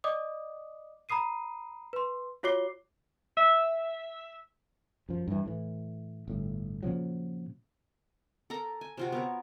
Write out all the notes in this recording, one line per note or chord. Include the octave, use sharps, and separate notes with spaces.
D5 D#5 D6 D#6
A#5 B5 D#6 C7 D#7
B4 C6
F4 F#4 C#5 D6 C7 G7
E5
F#2 F3
G2 E3
A2 E3
G1 A2
A#2 C#3 F3 F#3
A4 A#4 A#5
G#5
C3 F4 F#4
B3 A#4 C#5